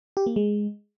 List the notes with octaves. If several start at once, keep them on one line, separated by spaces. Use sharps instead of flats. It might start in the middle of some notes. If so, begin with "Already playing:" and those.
G4
A#3
G#3